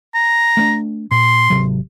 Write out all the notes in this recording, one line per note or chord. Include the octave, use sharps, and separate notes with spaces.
A#5
A3 B3 D4
A#2 C6
G#1 C3 F#3